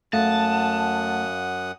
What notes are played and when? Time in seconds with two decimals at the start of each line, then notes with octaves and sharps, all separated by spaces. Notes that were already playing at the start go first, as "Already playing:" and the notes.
0.13 F#2 A3 F5 F#5 A5 D#6